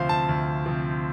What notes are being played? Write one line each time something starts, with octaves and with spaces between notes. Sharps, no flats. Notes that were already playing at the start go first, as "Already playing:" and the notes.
Already playing: D2 C3 F3 C5 F5
A5
D2
C3 F3